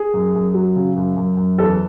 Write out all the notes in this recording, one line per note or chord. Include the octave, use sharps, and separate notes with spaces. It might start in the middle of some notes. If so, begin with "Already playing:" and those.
Already playing: G#4
F#2
F#2
F#3
C#3
F#2
F#2
F#2
E2 A4